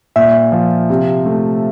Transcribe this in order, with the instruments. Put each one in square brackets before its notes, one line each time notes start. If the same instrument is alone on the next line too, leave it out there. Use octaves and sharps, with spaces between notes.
[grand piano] A#2 [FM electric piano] E5
[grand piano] F3
C3
A3